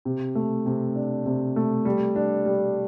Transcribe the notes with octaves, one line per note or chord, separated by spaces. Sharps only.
C3
A3
C3
D4
C3
A3
G3
D4
G3